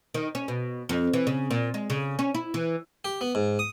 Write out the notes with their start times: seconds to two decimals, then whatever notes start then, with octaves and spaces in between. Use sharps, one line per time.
0.14 D#3
0.35 C#4
0.48 B2
0.89 F2
1.13 E3
1.27 C#3
1.51 A#2
1.74 G#3
1.90 C#3
2.19 C#4
2.34 E4
2.54 E3
3.05 G4
3.21 B3
3.35 G#2
3.59 D#6